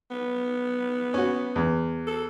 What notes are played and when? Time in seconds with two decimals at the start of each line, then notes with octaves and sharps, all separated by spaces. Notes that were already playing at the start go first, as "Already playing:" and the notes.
0.11 B3
1.14 C#4 F#4
1.56 E2
2.07 A4